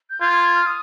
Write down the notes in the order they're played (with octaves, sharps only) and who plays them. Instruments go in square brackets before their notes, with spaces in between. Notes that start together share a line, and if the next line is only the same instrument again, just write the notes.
[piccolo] G6
[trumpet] F4 [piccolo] G#6
[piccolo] G#6
G#6
F6
D#6